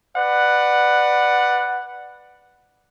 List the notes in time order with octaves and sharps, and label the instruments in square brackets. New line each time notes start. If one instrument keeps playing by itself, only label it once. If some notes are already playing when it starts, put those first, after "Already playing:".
[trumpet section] B4 D5 F#5